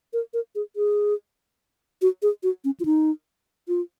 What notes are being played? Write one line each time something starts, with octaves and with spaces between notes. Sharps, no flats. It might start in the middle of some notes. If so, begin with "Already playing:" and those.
A#4
A#4
G#4
G#4
F#4
G#4
F#4
C#4
F4
D#4
F4